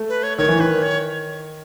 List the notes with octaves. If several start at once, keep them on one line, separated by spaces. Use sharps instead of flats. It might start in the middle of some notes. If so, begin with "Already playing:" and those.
Already playing: A3
B4
C#5
D#3 C#5
E3
D#3 B4
C#5